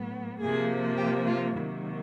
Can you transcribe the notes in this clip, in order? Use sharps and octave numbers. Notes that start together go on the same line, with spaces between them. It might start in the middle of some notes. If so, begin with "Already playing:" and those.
Already playing: A2 F#3 B3
C3 F3 A#3 G#4
G4
F4
C3 D#3 F#3 A#3 E4